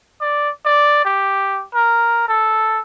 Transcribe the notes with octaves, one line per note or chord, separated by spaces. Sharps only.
D5
D5
G4
A#4
A4